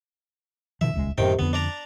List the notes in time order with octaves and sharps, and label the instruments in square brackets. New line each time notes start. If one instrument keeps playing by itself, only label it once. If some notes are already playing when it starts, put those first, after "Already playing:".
[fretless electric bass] B2 D#3 F3 [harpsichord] E5
[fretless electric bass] D#1 C#2 G#3
[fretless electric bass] F#2 A2 [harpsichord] C3 D#3 G5
[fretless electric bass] F2 D3 [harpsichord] B3
[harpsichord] D4 D5 A#5